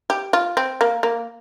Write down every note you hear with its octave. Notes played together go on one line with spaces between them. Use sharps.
G4
F4
C4
A#3
A#3